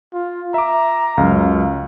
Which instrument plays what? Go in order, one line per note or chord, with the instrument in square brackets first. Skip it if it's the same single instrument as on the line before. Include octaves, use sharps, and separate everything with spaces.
[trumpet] F4
[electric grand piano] E5 D6 [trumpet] A#5
[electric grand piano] C#2 F#2 F#3 [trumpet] F5